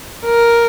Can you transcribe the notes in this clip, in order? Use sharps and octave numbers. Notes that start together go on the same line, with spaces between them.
A#4